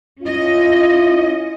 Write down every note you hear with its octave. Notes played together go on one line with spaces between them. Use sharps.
C#4 E4 F4 D#5